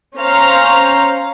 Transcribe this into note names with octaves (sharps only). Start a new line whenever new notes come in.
C#4 C5 F5 A#5